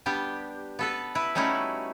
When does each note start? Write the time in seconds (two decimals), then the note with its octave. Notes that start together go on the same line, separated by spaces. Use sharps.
0.06 G3 B3 D4 G4
0.79 B3 A4 B4
1.15 E4 B4
1.35 G3 A3 C#4 D#4 E4 F#4